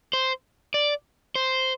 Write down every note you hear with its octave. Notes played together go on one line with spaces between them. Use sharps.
C5
D5
C5